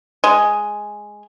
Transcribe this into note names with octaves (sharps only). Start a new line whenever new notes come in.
G#3